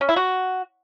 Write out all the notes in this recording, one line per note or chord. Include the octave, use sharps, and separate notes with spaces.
C#4
E4
F#4